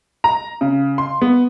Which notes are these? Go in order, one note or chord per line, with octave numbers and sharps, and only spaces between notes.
A#5
C#3
C6
B3